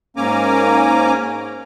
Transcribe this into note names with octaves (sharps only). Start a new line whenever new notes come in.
G#2 A#3 C#4 G#5 A#5 D6